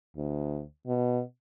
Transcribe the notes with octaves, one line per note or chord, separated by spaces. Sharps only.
D2
B2